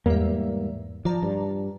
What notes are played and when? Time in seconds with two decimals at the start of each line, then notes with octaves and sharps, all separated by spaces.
0.06 E2 G#2 G3 A#3 E5
1.05 F3 D5 A5 A#5
1.23 G2